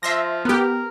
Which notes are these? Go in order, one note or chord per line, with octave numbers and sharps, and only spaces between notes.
F3 E5 C6 A#6
B3 G4 A#4